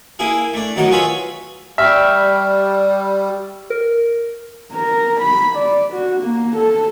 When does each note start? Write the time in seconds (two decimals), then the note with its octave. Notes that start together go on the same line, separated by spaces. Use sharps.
0.19 A#3 E4 G#4
0.54 A3 D4
0.76 A2 D#3 F#3 F#5
0.91 F4 G#4 B4 C#5 E5 B5
1.78 G3 E5 G5 C#6 F6
3.70 A#4
4.73 A#4
5.21 B5
5.56 D5
5.93 F#4
6.22 A#3
6.57 A4